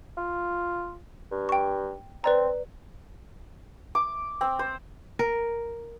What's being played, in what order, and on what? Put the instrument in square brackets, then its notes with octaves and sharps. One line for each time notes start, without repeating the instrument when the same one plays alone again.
[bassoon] F4
G2
[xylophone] G5 C#6
[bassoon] C4 [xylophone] B4 D5 A#5
[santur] D6
C4
C5
[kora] A#4